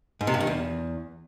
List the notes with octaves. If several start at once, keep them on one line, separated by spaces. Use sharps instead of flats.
G#2
C3
G2
D#3
E2